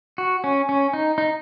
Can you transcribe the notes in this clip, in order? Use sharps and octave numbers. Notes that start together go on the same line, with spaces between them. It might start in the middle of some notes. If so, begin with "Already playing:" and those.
F#4
C#4
C#4
D#4
D#4